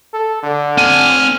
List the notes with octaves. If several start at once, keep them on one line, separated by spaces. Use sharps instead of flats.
A4
D3
C4 G#5 F6